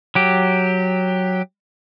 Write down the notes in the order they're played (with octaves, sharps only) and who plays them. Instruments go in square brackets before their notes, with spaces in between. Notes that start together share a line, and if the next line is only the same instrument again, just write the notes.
[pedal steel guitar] F#3 G4